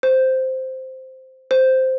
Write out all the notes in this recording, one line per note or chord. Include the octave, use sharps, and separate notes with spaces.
C5
C5